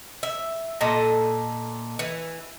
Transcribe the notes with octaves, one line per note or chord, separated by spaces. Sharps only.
E5
A#2 A4 D#5 A5
E3